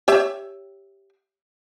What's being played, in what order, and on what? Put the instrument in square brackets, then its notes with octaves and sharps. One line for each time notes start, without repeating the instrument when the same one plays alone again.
[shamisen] G4 C#5 E5